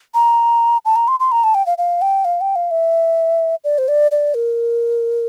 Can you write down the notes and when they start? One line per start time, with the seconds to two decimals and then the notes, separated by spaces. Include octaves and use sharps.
0.14 A#5
0.85 A5
0.96 A#5
1.08 C6
1.20 C6
1.32 A#5
1.43 A5
1.54 G5
1.66 F5
1.78 F5
2.02 G5
2.25 F5
2.41 G5
2.56 F5
2.71 E5
3.64 D5
3.78 C5
3.88 D5
4.11 D5
4.34 A#4